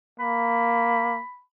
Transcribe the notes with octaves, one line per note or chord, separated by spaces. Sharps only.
A#3 B5